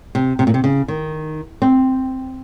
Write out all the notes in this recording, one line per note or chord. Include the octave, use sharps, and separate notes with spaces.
C3
C3
A#2
C3
C#3
D#3
C4